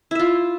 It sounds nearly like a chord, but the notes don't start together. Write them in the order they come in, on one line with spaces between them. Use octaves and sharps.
E4 E5 F4